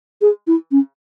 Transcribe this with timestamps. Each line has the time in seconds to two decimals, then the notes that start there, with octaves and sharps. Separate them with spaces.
0.21 G#4
0.47 E4
0.71 C#4